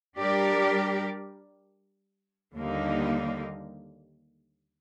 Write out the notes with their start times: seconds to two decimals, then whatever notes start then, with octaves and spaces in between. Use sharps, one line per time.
0.19 G3 D4 G4 A#4 D5
2.56 D#2 D3 G3 A#3 D#4